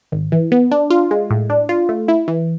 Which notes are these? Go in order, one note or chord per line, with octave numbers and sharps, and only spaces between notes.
G#1
E3
B3
D4
F4
G#3
A2
D4
F4
A3
E4
E3